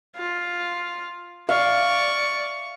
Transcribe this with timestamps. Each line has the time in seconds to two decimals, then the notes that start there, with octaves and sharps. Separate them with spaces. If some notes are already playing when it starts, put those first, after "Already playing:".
0.16 F4
1.49 D5 F5 C#6